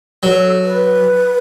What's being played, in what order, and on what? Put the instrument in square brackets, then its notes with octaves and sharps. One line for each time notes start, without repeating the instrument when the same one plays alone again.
[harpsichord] F#3 [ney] A4 B4
[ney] B4